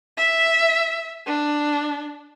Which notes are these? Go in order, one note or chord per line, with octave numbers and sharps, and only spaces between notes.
E5
D4